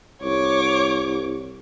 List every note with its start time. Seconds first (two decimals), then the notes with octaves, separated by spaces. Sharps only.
0.22 C2 C#5 D6